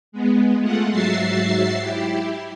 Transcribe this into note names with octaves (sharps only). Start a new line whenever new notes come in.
G#3 B3
G#3 A3 F4 F#5
G#2 F#3 F#4 E5 A6 C7
E4 G4